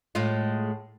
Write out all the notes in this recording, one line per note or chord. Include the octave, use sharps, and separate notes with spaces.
A2 G#3 F4